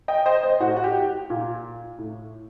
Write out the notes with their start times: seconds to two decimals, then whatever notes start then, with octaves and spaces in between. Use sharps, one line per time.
0.08 D#5 G5
0.26 C5 D#5
0.43 C5 D#5
0.60 A2 F#4
0.76 F#4
0.84 G4
1.30 A#2
1.98 A2